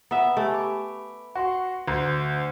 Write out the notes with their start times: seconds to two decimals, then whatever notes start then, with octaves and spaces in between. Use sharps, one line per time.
0.11 B3 E5 A#5
0.37 A3 G4 G#5
0.54 B5 D6
1.36 F#4 F#5 C6 C#6
1.87 D2 C6